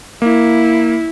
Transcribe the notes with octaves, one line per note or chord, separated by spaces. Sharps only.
A#3 E4